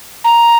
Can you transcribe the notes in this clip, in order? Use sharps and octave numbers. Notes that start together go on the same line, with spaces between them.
A#5